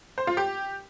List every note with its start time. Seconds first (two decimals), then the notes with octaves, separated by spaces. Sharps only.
0.18 C5
0.27 F4
0.37 G4